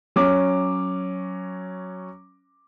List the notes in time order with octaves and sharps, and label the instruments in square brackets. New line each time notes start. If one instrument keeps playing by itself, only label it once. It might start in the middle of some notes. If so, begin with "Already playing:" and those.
[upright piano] F#3 C#4 D6